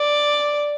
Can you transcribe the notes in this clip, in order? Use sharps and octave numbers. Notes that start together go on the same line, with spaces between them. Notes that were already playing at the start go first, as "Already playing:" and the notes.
Already playing: D5